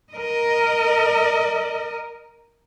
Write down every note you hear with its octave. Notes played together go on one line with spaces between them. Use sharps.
A#4 D#5